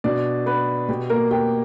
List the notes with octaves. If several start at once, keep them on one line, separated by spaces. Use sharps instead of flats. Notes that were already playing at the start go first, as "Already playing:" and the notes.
B2 D4 D5
B3 B4
B2 G4
A#3 A#4
G4 G5